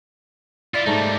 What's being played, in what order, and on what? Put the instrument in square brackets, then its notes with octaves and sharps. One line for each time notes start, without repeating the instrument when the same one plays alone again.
[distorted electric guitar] E4 F4 [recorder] D5
[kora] G#2 A3 A#3 [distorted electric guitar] G3 D#4